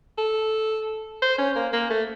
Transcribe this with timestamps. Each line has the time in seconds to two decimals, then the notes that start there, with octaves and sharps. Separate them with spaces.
0.18 A4
1.22 C5
1.38 C#4
1.56 A#3
1.73 A#3
1.90 A3